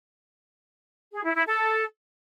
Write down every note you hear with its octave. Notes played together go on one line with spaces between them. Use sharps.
G#4
E4
E4
A4